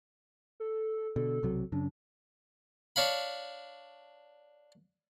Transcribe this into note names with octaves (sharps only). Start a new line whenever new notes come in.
A4
B2 D3 A4
B1 C3 F#3
F#2 C#3 D4
D4 C#5 F5 B5